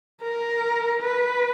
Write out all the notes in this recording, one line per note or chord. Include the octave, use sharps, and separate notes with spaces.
A#4
B4